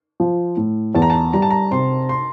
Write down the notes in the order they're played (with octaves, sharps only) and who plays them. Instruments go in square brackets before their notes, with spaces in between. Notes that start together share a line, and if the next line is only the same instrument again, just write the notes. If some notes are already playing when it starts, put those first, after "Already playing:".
[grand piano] F3
A2
[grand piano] E2 [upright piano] A5
[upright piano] A#5
A5
[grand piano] G3 [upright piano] A#5
[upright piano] A5
A#5
[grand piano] C3 [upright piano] C6
[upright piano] C6